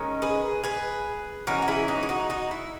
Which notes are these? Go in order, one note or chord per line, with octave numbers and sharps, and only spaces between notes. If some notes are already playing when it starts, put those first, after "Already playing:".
Already playing: D#3 G#3 C#4
G#4 B4
G#4 B4
E3 G#3 C#4 F#4 A#4
F#4
E4 G#4
D#4 F#4
G#4
D#4 F#4
D#4 F#4
E4